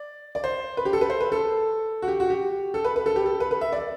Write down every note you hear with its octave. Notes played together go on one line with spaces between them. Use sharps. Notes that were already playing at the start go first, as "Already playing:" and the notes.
Already playing: D5
D5
C5
B4
G4
A4
B4
C5
B4
A4
F#4
G4
F#4
G4
A4
B4
B4
A4
G4
A4
B4
B4
E5
D5